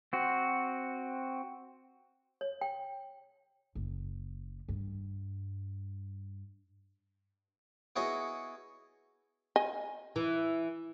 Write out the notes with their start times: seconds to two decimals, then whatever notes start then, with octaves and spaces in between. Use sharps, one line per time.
0.13 C4 F#4
2.41 C#5
2.61 G5
3.75 F#1
4.69 G2
7.96 B3 E4 F#4 G#4 C#5 D#5
9.56 D#5 G#5
10.16 E3